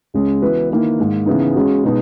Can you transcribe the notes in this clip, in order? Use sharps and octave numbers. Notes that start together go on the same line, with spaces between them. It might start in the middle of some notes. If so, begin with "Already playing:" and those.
C#2 C#3 G#3 C#4
E3 B3 F#4 B4
D#3 A#3 E4 B4
G#2 D#3 A#3
C#3 E3 B3 D#4
C#3 G#3 C#4 F#4
B2 G#3 B3 D#4